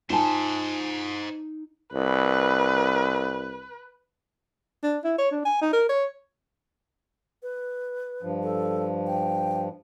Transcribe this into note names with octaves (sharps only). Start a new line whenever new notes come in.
D#4 F4 C5 D#5 G#5 A5
C2 B4
D4
E4
C#5
D4
G#5
D#4
A#4
C#5
B4
G2 F3
A4
G5